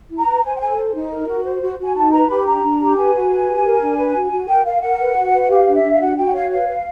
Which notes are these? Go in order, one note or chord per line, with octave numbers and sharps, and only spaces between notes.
E4
A#5
B4
C5 G#5
G5
A4 G#5
C5
D#4
A#4
F#4
C5
F#4
F#4 G#5
D#4 A5
B4 A#5
G4 B5
D4 A#5
D4
G4
B4 G#5
F#4
B4
G4
A#4
D4
B4
F#4
F#4
A#4 G5
A#4 F5
A#4 F#5
B4
F#4
B4
G4 F5
D4
E5
D4
F5
F#4 F#5
F#4 G5
F#5
C#5 F5
B4 F5
B4